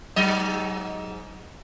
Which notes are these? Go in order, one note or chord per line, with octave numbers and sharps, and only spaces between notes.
G#2 F#3 D#5